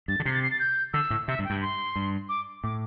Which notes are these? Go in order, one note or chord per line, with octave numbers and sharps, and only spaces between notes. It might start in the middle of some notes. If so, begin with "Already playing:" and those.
G2 A6
D3
C3 C7
A6
C7
A6
G6
D3 E6
A2
C3 E5
G2
G5
G2
C6
G2
D6
A2 D6